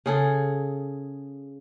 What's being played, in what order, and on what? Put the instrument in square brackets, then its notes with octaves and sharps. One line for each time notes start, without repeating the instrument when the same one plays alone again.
[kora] C#3 G#4 A4